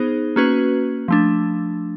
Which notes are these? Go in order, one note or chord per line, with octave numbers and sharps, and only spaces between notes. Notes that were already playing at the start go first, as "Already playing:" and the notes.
Already playing: B3 D#4 G#4 C5
A#3 C#4 F#4 B4
F3 A3 D4